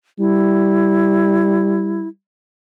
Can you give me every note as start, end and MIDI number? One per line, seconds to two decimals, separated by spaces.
0.19 2.06 55
0.19 2.08 64